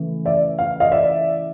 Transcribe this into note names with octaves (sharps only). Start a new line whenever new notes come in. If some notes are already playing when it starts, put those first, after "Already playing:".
Already playing: C#3 E3 A3
D5 E5
F5
D#5 F5
D5 E5